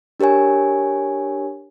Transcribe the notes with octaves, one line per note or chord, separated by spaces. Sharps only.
D4 G4 A#4 C#5 G#5